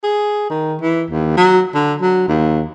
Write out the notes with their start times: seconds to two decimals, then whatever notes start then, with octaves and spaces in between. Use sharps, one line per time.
0.04 G#4
0.50 D#3
0.81 E3
1.10 D#2
1.37 F#3
1.75 D3
2.01 F#3
2.28 D#2